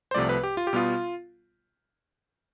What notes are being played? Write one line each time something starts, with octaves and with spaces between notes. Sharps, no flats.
C5
C2 C3 F3 A3 D5
B4
G4
F4
G4
B2 G3 B3 F4